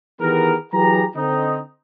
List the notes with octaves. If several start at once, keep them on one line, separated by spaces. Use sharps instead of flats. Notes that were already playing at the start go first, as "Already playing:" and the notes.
D#3 E3 B3 G4 G#4 A#4
E3 F#3 G4 G#4 B4 A#5
D3 C4 D#4